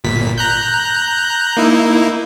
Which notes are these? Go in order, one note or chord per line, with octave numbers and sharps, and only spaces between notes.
G1 A#2 B6
A#5 F#6 G6
A#3 D#4 E4